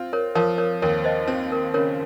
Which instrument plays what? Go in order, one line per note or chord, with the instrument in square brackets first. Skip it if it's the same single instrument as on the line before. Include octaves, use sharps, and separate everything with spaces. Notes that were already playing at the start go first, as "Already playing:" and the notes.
Already playing: [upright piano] C4 F4
[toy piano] A#4 C#5
[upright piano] F3 [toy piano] A#4 C#5
[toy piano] A#4 C#5
[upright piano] D#2 [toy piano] A#4 C#5
[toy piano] C5 D#5
[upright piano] C4 [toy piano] C5
[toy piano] A#4
[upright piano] C#3 [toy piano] A#4 C#5